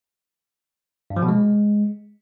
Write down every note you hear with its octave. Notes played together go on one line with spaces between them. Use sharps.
G2
F3
B2
G#3